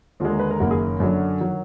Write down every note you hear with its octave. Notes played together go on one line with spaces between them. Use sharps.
D#2 D3 G#3 F4
A#4
B4
A#4
F#1 F#2 D#3 A#3 F#4
G#4
F#2 D3 F#3 D4
D#3 F#3